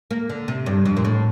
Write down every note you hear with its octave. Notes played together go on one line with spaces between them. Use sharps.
A#3
D3
C3
G2
F2
A#2
A2